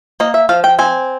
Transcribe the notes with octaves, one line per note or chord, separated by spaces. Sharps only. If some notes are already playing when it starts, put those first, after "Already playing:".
A#3 D#5
E5
F3 F5
G5
C4 G#5